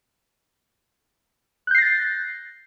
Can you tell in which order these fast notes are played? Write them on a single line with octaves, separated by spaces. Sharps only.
F#6 G6 C7 A#6 A6